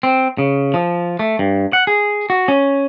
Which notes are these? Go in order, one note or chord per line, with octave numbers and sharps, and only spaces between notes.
C4
C#3
F3
A3
G2
F#5
G#4
F#4
C#4